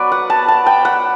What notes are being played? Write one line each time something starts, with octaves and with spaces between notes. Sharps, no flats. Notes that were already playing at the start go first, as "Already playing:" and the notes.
Already playing: F#3 B3 B4 D5
F#5
A5
A5
G5
F#5